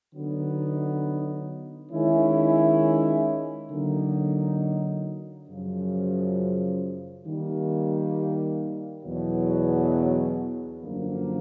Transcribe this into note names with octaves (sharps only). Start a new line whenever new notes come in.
D3 F#3 B3 D#4
D#3 G#3 C#4 E4
D3 F#3 A#3 D#4
F#2 C#3 F3
D#3 G3 A#3
E2 B2 F#3
F#2 D3 F3 A#3